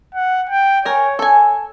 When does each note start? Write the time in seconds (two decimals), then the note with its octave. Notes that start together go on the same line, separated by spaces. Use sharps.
0.15 F#5
0.49 G5
0.85 A#4 C#5 G#5
1.19 A4 G#5